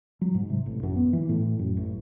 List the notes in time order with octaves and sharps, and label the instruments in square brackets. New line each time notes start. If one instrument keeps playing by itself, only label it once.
[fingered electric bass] F#3
G#2
C3
A1
F#2
B3
E3
A2
F#2
A1